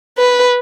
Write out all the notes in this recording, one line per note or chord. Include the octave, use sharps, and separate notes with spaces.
B4